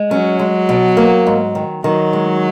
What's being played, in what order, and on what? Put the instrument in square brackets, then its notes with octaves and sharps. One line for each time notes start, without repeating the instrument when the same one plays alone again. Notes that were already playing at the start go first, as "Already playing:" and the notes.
Already playing: [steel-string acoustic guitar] G#3
[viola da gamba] F#3 [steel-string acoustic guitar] C#4
[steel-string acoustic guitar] G#3
B2
A#3
G#2
D#3
[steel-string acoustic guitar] D#3 [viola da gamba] F#3
[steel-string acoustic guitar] G#3